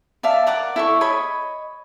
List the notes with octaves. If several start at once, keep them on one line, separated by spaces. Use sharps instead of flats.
D5 E5 F5 A5
A#4 D5 F#5 D6
E4 A4 C#6
C#5 D#5 B5